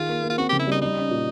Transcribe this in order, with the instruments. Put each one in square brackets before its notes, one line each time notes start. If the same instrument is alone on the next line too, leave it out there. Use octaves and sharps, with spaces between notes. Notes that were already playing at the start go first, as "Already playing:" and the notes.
Already playing: [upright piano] D#3 G#4 [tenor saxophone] F4
[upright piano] A#3
A#3
[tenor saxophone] F4
[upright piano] C4 [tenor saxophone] F#4
[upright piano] C#3 [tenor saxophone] G4
[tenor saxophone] E4
[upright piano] G3 [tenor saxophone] D#4
[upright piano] G3 [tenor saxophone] D#4
[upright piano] C#4
A#2